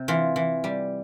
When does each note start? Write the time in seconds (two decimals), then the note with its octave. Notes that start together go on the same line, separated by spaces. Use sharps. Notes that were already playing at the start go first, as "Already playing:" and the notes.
Already playing: C3
0.08 E3 F4
0.36 E3
0.64 G3